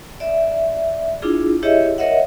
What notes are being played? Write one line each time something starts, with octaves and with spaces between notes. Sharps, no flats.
D5 E5
D4 E4 F4 G#4
E4 G4 G#4 C#5 D#5 E5
A#4 C#5 D#5 E5 F#5